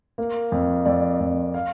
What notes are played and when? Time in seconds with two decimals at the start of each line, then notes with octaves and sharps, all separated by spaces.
0.18 A#3
0.52 F2
0.85 F2 D5
1.20 F2
1.54 F5